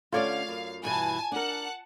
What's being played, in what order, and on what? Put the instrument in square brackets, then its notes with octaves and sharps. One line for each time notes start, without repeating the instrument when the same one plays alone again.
[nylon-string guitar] D3 A3 C#4 [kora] F4 C#5 D5 [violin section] F5
[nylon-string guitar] F#2
[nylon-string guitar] G2 B2 E3 [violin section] G#5 A5
[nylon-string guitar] D4 A#4 [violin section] F#5 A5 F#6